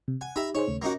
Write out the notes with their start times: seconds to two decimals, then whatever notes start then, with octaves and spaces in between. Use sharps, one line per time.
0.08 C3
0.21 F#5 G#5
0.36 D#4 G4 E5 A#5 B5
0.55 D#4 G#4 C5 C#5
0.68 D#2 C#3 A3
0.82 A#3 C#4 D#4 F#4 A#6